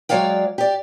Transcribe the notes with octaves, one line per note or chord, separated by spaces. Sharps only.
F#3 G#3 C#5 D5 F5 G5
G4 D5